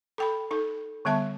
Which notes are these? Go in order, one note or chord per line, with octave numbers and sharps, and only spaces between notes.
A4 G5 B5
D#4 A4
D3 G3 B3 E5 A5